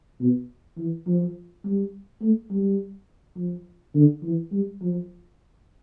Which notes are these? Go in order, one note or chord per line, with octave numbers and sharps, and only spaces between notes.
B2
E3
F3
G3
A3
G3
F3
D3
E3
G3
F3